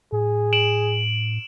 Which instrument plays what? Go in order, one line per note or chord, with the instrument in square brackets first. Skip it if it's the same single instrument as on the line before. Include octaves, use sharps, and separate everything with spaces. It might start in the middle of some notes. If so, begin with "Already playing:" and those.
[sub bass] A2 [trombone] G#4
[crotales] D7 E7 F#7